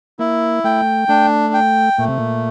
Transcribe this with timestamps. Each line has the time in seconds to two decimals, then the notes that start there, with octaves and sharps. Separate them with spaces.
0.19 A#3 E4
0.64 A3 G5
1.09 A3 D4
1.54 G5
1.98 A#2 A3
2.08 C3
2.18 A#2